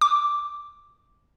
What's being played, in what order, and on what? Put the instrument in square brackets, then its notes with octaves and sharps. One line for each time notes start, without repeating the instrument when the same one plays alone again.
[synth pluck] D6